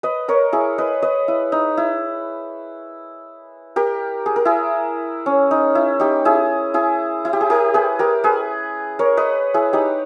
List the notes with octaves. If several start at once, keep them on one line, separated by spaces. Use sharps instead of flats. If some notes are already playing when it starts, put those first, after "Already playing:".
B4 D#5
A#4 C#5
E4 G#4
B4 D#5
B4 D#5
E4
D#4
E4
G4 A#4
G#4
A#4
E4 G#4
C#4
D#4
E4
D#4 G4
E4 G#4
E4 G#4
E4
G4
G#4
G4 A#4
G#4 B4
G4 A#4
G#4 B4
A#4 C#5
B4 D#5
E4 G#4
D#4 G4